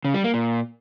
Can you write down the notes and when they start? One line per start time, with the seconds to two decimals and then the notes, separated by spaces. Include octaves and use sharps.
0.05 C#3
0.14 G3
0.24 A#3
0.34 A#2